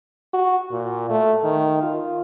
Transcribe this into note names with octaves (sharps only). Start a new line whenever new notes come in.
F#4
A#2
A3
D#3
F4